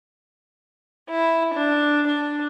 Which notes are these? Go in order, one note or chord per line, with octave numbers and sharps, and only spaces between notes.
E4
D4
D4